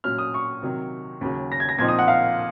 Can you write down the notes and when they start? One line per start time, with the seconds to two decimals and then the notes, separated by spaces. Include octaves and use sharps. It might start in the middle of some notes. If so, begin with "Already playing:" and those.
0.04 A#2 F#3 C#4 F6
0.18 D#6
0.34 C#6
0.62 C3 D#3 F#3
1.21 D#2 C#3 F#3 C#4
1.52 A#6
1.60 G#6
1.69 A#6
1.79 A#2 F3 C4 D#4 G#6
1.88 D#6
1.99 F#5
2.08 F5